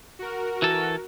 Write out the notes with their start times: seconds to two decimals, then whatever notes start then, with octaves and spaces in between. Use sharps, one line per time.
0.19 F#4 A#4
0.62 E3 A4